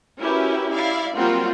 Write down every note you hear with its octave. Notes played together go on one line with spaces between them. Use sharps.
C#4 E4 F#4 G4 A#4 B4
E4 D5 F5
F#3 G3 A#3 C4 F4 F#4